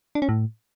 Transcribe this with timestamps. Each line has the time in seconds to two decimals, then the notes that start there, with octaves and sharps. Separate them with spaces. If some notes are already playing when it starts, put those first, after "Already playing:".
0.15 D4
0.22 C#4
0.29 A2